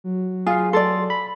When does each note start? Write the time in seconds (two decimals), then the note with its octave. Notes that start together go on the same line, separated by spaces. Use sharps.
0.04 F#3
0.47 F4 G#4 F5
0.73 A4 D5 C6 A6
1.10 B5